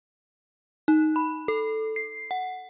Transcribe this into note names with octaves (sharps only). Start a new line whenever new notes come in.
D#4
B5
A4
C7
F#5